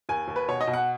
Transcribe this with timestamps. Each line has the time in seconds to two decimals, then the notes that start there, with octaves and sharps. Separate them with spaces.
0.09 D#2 G#5
0.28 D#2
0.36 B4
0.48 B2 C#5
0.61 D#5
0.67 B2
0.73 F#5